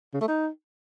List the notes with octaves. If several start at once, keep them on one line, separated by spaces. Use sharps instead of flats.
C#3
A3
D#4